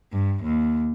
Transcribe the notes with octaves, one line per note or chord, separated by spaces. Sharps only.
G2
D#2